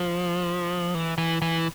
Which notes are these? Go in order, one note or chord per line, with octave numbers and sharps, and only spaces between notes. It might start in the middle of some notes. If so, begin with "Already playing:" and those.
Already playing: F3
E3
E3
E3